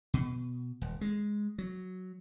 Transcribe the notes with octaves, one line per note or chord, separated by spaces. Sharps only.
B2
D#1
G#3
F#3